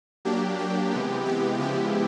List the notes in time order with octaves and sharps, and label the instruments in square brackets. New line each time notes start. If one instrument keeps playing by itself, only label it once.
[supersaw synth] F#3 A#3 D4 G4
G4
C3 E3 G#3 B3
G4
C#3 F3 G#3 B3 E4 G4